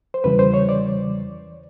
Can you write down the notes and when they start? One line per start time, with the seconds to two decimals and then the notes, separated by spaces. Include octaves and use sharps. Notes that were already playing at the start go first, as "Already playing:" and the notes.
0.14 C5
0.24 E2 C#3 E3 G3 B4
0.39 C5
0.54 C#5
0.69 D5